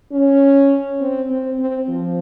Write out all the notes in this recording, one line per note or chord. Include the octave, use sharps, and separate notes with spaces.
C#4
C4
C4
C4
F3